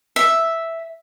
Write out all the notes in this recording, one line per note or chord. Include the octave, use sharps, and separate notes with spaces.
E5